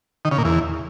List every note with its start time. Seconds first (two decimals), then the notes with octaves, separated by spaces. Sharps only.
0.25 D#3
0.31 C#3
0.38 A#2
0.45 E2